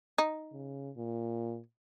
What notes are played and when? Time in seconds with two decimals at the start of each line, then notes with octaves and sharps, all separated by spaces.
0.18 D#4
0.52 C#3
0.96 A#2